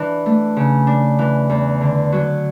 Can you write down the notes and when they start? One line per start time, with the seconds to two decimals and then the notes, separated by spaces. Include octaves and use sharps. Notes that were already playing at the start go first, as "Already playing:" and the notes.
Already playing: E3 D4
0.26 A3
0.57 C#3
0.87 D4
1.19 E3
1.50 E2
1.81 D3
2.12 F#3